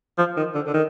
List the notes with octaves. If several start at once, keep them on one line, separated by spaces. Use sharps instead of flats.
F3
D#3
D3
D3
D#3